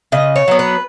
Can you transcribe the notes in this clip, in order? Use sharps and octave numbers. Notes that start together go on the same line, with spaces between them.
C#3 D#5
C#5
F#3 B3
B4